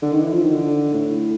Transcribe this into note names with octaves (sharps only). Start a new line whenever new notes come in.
D3
D#3
E3
F3
D#3
D3
A2